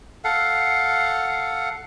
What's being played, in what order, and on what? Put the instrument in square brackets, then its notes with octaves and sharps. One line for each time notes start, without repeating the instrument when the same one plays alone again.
[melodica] A4 F5 F#5